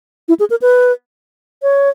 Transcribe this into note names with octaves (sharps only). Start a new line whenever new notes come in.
E4
G#4
A#4
B4
C#5